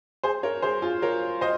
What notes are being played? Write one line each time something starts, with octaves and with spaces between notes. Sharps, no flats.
G#4 C5
A#4 C#5
G#4 C5
F4 G#4
A#4 C#5
C5 D#5